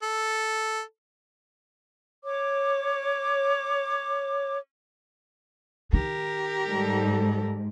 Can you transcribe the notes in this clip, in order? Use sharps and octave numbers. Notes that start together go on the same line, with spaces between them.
A4
C#5 D6
D#3 G4 A#4
G#2 G3 A4